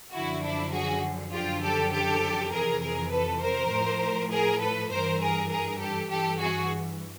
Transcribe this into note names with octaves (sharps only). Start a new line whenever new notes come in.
F#2 D3 F3 E4 F#4
D4 E4
F#4 G#4
F#2 D3 F3 F4 G4
G4 A4
G4 A4
F2 C3 E3 G#4 A#4
G#4 A#4
A4 B4
A#4 C5
A2 F3
G#4 A#4
A4 B4
G2 E3 A#4 C5
G#4 A#4
G#4 A#4
G4 A4
G2 E3 G4 A4
F#4 G#4